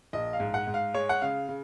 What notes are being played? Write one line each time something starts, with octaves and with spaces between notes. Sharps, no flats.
A#1 D#5
F5
G#2
F#5
G#2
F5
G#3 C#5
F#5
C#3 F5
C#3